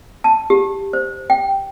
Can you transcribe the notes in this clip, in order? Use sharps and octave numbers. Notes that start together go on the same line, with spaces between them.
A5
G4
C5
G5